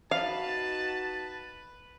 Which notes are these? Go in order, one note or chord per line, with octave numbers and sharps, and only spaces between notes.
D#4 F#4 B4 F5 A5